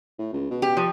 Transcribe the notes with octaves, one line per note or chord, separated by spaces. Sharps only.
A2
C#2
B2
G4
F3